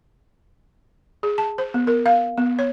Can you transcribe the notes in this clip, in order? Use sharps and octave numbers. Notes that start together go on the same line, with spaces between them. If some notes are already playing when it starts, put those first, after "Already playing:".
G#4
A5
C5
B3
A#4
F5
B3
C#5